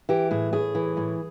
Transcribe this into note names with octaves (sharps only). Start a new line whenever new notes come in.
E3 G4
A2 G#4
A2 G#4
E3
A2